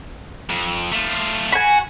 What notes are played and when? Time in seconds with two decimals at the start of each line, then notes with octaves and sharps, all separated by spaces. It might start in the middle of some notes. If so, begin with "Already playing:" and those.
0.50 F2
0.92 A3 F4
1.52 F#4 G#5 B5